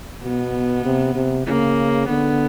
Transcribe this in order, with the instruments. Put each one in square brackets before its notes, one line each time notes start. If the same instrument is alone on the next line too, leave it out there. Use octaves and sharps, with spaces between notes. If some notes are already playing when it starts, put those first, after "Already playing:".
[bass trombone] B2 [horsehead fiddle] B3
[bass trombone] C3
C3
[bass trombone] C#3 [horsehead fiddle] A#3
[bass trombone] D3 [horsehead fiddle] B3